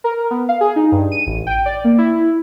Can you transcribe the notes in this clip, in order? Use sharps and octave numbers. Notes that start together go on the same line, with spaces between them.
A#4
B3
F5
G#4
D#4
G2
D#7
A1
G5
D5
A#3
E4